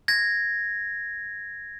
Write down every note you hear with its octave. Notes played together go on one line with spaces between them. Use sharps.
G#6 A#6